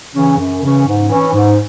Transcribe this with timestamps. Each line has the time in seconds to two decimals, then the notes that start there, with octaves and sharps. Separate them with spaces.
0.13 C#3 E3 C#4
0.38 F#2
0.61 C#3 E3 C#4
0.86 G#2
1.09 E3 C#4
1.33 G#2